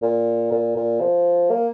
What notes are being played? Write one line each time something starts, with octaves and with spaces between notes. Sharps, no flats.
A#2
A#2
A#2
F3
A#3